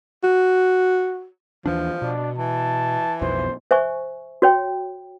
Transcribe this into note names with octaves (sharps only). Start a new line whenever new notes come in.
F#4
D#2 E3 F3 D4
B2 D4
E3 A5
B1 F2 B2 C5
C5 E5 G#5 C#6
F#4 C#5 G5